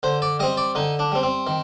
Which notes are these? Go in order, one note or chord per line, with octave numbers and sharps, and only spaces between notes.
D3 C5
D5
G3 C4 D#5
D5
D3 D#4
D4
G3 C4
C4
D#3